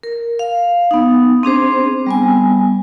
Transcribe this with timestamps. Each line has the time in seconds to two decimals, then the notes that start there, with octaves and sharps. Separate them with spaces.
0.03 A#4
0.39 F5
0.91 B3 D#4
1.43 C4 D4 G#4 C5
2.06 G3 B3 G#5